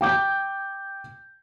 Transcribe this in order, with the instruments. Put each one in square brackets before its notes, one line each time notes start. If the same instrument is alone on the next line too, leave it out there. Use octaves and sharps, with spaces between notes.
[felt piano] G5 D6 G6